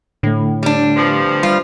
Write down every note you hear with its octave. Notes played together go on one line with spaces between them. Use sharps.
A2 D3 A3
G3 D4
G2 C3 F3
G3 F4